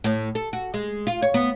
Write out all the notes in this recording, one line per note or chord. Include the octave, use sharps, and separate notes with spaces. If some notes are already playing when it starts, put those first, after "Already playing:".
A2
A4
F#4
G#3
F4
C#5
B3